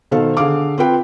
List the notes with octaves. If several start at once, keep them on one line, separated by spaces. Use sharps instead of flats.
B2 D#3 A4 C5 F5
D3 G#4 F5 D6
C4 F4 B4 G5